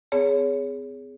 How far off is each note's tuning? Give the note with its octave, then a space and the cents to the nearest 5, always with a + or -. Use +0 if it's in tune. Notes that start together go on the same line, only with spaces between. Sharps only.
C4 -40 G#4 +0 C#5 +25